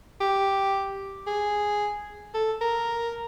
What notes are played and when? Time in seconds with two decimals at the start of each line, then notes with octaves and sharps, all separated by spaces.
0.21 G4
1.27 G#4
2.34 A4
2.61 A#4